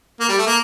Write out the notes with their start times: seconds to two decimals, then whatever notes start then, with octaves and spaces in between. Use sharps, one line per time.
0.20 A#3
0.29 G3
0.39 A3
0.47 A#3